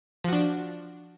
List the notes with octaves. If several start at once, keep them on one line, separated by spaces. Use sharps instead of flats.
F3 D4 F#4